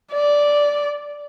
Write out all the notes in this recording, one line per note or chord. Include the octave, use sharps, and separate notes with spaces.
D5